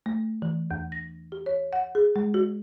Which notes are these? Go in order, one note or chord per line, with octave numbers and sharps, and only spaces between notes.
A3
E3
E2
A#6
G4
C#5
F#5
G#4
G#3
F#4